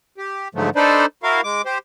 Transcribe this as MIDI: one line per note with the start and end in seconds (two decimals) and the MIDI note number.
0.18 0.48 67
0.55 0.70 44
0.55 0.70 50
0.55 0.70 53
0.55 0.70 54
0.55 0.70 57
0.76 1.06 62
0.76 1.06 63
0.76 1.06 69
0.76 1.06 71
0.76 1.06 72
0.76 1.06 74
1.23 1.41 64
1.23 1.41 66
1.23 1.41 70
1.23 1.41 77
1.44 1.62 56
1.44 1.62 86
1.65 1.78 67
1.65 1.78 72